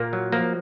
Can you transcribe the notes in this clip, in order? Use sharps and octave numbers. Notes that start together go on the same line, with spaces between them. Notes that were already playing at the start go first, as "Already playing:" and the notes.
Already playing: A#2 A#3
F#3
F3 A#3